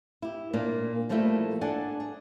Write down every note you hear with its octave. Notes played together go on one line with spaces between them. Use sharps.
E4 G4
A#2 A#3 D4
F3 G3 A3 A#3 E4 A4
D4 A4 D5 F#5 G#5
G#4